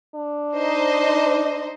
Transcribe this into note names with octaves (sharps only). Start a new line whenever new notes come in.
D4
D#4 C5 D#5